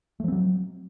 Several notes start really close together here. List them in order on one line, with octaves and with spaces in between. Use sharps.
A3 F3 C4 F#3